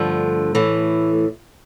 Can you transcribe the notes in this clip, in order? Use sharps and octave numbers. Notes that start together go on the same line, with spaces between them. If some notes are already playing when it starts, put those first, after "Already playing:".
Already playing: G2 D3 F3 A3
A2 E3